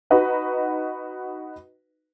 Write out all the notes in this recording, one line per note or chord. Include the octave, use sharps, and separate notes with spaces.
D#4 F#4 B4 D#5